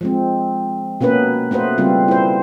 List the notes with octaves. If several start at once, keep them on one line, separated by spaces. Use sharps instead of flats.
F3 G#3 C4
B2 A#3 B3 C#4 B4
A3 B3 F#4 B4 C5
C#3 G3 C4 F4
E4 C5